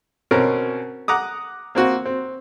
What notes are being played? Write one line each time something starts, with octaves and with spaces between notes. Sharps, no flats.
B2 C4 C#4 A#4
F#5 A#5 D6 D#6
A#3 C4 F#4
C4